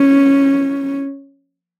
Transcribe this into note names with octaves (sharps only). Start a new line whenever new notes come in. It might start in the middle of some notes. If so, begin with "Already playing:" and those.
Already playing: C#4